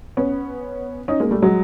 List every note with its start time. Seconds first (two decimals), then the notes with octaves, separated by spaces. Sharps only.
0.17 B3 C#4
1.08 C#4 D#4
1.20 G#3 A#3
1.31 G3 A3
1.42 F#3 G#3